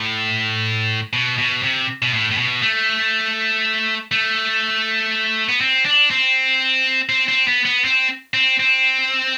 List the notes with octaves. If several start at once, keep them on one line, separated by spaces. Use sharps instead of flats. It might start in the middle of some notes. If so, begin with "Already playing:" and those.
Already playing: A2
B2
B2
C3
B2
A2
A2
B2
A3
A3
B3
C4
D4
C4
C4
C4
B3
B3
C4
C4
C4